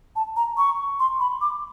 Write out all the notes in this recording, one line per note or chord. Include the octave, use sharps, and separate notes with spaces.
A5
A#5
C#6
C6
B5
D6